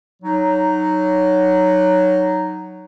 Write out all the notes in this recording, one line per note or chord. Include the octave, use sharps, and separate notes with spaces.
F#3 D#4